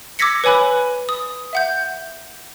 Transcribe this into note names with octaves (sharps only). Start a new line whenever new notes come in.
D6 E6 G#6 A#6 B6 C#7
B4 C#5 G#5 B5 F#6
D#6
E5 F#5 G6